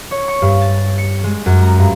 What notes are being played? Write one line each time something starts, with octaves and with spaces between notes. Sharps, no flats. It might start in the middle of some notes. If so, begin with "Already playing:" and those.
C#5
C#6
G2
A6
C#7
G#3
F#2
A#5
G2